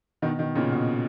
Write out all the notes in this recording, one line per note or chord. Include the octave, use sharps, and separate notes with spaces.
B2 D#3
B2 D#3
A#2 C#3
B2